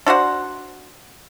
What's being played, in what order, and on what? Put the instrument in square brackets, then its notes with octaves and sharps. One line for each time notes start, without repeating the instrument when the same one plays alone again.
[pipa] D4 F#4 C5 F#5